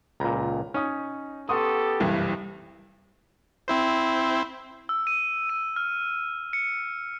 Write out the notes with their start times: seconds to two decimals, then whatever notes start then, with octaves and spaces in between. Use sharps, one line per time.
0.20 C#2 A#2 A#5 B5
0.74 C#4 D#4 D#6
1.49 B3 G4 A4 F#5 C6 C#6 D#6
2.00 F#1 C2 G2 E3
3.68 C4 E4 C5
4.89 E6
5.07 D#7
5.50 D#7
5.76 F6
6.53 C#7